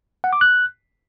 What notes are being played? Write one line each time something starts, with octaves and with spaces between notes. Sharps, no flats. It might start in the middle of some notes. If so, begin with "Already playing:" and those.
F#5
D6
F#6